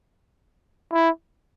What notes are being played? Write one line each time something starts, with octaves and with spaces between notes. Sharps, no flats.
E4